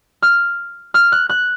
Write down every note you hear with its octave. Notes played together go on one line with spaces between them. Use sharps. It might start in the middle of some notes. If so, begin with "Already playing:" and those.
F6
F6
F#6
F#6